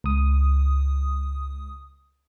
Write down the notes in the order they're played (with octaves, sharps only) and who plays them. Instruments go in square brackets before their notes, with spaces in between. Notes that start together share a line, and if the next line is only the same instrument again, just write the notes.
[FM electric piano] C#2 D#6